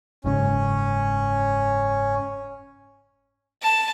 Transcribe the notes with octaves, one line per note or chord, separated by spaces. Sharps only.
F#1 G#2 C#3 C#4
A5